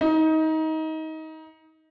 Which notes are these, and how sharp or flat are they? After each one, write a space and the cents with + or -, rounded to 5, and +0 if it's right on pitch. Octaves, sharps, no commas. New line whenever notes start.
D#4 +25